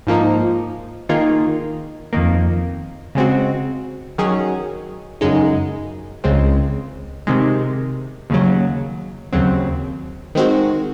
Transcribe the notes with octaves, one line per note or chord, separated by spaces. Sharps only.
G#2 F3 A#3 D#4
D#3 A#3 F4 G#4
F2 D#3 A#3
C#3 G#3 C4 F#4
D#3 F#3 C#4 G#4
F#2 C#3 G#3 D#4
C#2 C#3 G#3 C4
C3 D#3 G#3
D#2 C#3 F#3
D#2 C#3 F#3 C4
D#3 G#3 C4 F#4